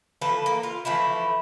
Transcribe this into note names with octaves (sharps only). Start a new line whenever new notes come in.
E3 F3 A4 B4
A#3
F4
E3 F3 A3 E4